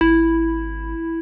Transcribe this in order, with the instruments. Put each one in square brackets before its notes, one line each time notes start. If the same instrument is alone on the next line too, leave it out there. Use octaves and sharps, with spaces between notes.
[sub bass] G#1 [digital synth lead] E4